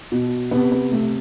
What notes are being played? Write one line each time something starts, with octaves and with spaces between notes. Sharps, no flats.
B2
C3 B3
B3
C3 A3